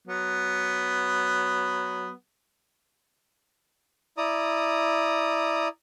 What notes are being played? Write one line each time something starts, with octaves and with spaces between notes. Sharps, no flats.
F#3 B3
E4 D5 A#5 D#6